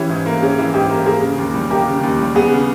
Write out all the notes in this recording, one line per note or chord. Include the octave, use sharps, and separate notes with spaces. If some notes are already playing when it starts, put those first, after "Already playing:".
Already playing: E3 C#4 G4
G#2
A#3
C#4 G#4
E3
G#2 G4
A#3
A#3 G#4
C#3
D#2
G3
A#3 G4
C#3
D#2
G3
B3 G#4
C#3